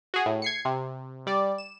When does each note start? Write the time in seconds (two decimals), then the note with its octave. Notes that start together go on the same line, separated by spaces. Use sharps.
0.14 F#4 G#4
0.26 A2
0.42 G#6 C7 C#7
0.65 C3
1.27 G3 D5
1.58 E7